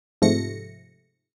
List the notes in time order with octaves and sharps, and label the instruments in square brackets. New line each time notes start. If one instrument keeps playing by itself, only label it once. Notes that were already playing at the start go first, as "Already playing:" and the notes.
[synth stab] G#2 C3 F3 A3 A#6 C#7